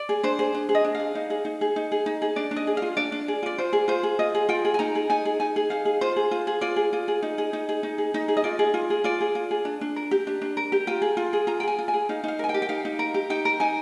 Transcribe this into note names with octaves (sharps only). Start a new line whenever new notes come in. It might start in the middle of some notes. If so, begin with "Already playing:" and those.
Already playing: D5
G#4
D4 C5
G#4 C5
D4
G#4
D#5
D4
F5
G#4
D#4
G#4
D#4
G#4
D#4
G#4
D#4
G#4
D4 D5
D4
D#5
G#4
F5
F4
D4 D5
D4
G#4
F4 D5
F4 C5
G#4
F4 C5
G#4
F4 D#5
G#4
F4 G5
G#4
G#5
D#4 A#5
G#4
D#4 G#5
G#4
D#4 G#5
G#4
D#4 F5
G#4
F4 C5
G#4
F4
G#4
F4 D5
G#4
F4
G#4
D#4
G#4
D#4
G#4
D#4
G#4
D#4
G#4
D#5
F4 D5
G#4
F4
G#4
F4 D5
G#4
F4
G#4
D4
D4
A#4
G4
D4
D4
A#4
G4
F4 G5
G#4
F4
G#4
F4 A#5
G5
G#4 G#5
F4
G#5
G#4
D#4 F5
D#4 F5
A#4 G#5
G5
G4
G5
D#4 F5
D#4
A#4
G4
D#4 G5
A#4
D#4 G#5